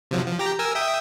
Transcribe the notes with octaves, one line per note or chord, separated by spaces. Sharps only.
C3 F3 F#3
F3
G4 G5 A#5
A#4 G#5 E6
E5 G5 D#6